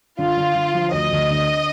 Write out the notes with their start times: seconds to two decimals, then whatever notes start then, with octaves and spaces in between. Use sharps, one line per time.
0.18 D3 F4
0.37 D3
0.55 D3
0.74 F3
0.93 D2 D#5
1.11 D2
1.30 D3